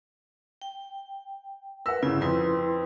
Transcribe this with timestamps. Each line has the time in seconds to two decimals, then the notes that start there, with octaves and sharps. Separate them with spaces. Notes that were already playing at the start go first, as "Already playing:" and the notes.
0.62 G5
1.86 A#4 B4 F#5 E6
2.03 G1 C#3 E4
2.22 F2 E4 B4 C6